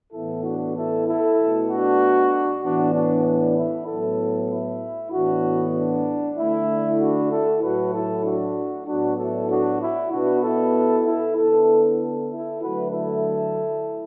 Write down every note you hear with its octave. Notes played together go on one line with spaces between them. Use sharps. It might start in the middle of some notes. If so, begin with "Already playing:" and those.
A2 E3 B3 E4 A4
D4 F#4
E4 A4
E4 A4
B2 A3
D4 F#4
A2 E3 B3 D4 F#4
D4
D4
E4
A2 F#3 B3 E4 A4
E4
A2 E3 B3 D4 F#4
D4
D3 A3 E4
D4 F#4
E4 A4
A2 F#3 A3 F#4 B4
E4 A4
D4 F#4
A2 F#3 B3 D4 F#4
E4 A4
D4 F#4
E4
B2 B3 D4 F#4
E4 A4
E4 A4
D3 B3 E4 A4
E4 A4
D3 F#3 A3 F#4 B4
E4 A4